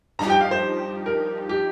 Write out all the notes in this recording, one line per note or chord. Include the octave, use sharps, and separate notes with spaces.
G2 F3 D#4 G4 A#5
G5
F5
C5
A#4
G4